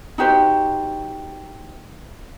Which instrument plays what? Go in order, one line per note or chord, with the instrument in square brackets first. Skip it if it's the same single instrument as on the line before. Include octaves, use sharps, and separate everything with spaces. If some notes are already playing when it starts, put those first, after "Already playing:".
[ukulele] D#4 F#4 G4 C5